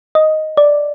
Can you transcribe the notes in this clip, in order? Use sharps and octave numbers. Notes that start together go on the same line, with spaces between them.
D#5
D5